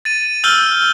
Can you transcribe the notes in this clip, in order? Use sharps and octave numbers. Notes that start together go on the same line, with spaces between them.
A6 D#7
E6 F6 G6 G7